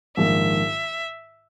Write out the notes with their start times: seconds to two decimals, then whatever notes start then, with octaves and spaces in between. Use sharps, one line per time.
0.17 A#1 G#2 D#3 E5